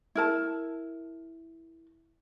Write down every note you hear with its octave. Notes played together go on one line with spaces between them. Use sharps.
E4 A#4 A5